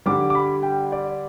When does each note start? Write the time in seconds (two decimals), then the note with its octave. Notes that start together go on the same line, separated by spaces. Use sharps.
0.06 G2 D3 G3 D6
0.30 D6
0.35 B5
0.63 G5
0.92 D5